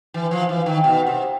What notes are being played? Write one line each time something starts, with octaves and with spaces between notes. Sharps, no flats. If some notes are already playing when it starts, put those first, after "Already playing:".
E3
F3
E3
D#3
B2
C3